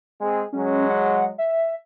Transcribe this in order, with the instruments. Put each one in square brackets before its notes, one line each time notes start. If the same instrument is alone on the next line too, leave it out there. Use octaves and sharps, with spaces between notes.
[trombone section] G#3 C4 G#4
[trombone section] F#3 G#3 [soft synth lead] C#4
[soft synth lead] F#5
E5